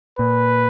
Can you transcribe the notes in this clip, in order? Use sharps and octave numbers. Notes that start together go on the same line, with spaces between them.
A#2 B4